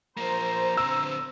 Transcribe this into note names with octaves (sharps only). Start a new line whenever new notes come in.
F3 A#3 C5 A#5
D3 C4 E6